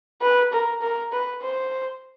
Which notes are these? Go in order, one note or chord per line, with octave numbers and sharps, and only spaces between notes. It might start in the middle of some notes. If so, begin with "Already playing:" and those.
B4
A#4
A#4
B4
C5